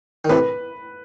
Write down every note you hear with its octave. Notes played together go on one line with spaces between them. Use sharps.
D#3
A2 C3 B4